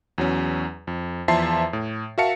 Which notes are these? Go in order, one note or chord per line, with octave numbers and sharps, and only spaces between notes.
E2 F#3 C#4
F2
E2 F3 E5 A5 C6 C7
A2
F#4 A#4 E5 F5 A5 C#7